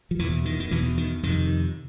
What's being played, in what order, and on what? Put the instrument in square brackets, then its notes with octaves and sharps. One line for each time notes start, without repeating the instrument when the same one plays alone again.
[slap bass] F3
E2 E3
B2
D#3
D#3
E2 B2 E3
D#3
F2 C3 D#3